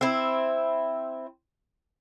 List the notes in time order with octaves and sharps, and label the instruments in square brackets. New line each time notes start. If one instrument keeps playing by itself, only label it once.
[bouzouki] C4 E4